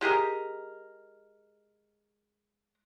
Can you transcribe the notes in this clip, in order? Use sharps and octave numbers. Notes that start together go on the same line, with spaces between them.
G#3 G4 G#4 A#4